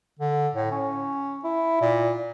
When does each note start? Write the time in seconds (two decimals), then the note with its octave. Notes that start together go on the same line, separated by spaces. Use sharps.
0.19 D3
0.54 A2
0.71 C#4
1.44 E4
1.81 A#2